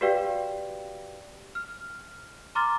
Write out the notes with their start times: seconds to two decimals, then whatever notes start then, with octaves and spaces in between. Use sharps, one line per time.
0.01 F#4 G4 B4 D5 F5 G5
1.55 F6
2.55 A#5 C6 D6 F6 A6